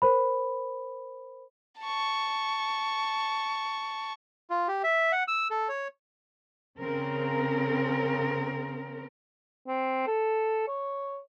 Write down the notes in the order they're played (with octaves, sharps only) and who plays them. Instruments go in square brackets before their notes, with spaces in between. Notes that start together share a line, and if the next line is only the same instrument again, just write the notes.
[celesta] A#4 C5 B5
[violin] A5 C#6
[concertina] F4
G4
E5
F#5
E6
A4
C#5
[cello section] C#3 C4 A#4
[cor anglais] C4
A4
C#5